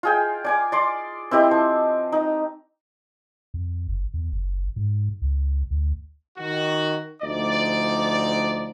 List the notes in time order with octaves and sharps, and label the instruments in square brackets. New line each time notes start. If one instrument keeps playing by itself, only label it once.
[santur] F4 G#4 G5
D5 G#5 D6
D5 C6 D6
C4 E4 G4 D#5
F3
D#4
[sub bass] F2
F#1
E2
F#1
G#2
C#2
D2
[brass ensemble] D#3 F#4
D2 F3 D#4 D5